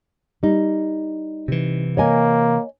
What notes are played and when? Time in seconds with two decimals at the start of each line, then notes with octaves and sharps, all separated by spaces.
0.43 G3 D#4
1.48 C3 E3
1.97 A#3 C#5 D#5 G#5